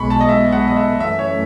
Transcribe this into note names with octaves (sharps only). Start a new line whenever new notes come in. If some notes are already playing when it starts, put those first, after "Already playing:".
Already playing: B1 B2 G#3 B5 C#6
A5
D#5
E5
F#5
D#5
E5
F#2 E3 A3 C#4 E5
C#5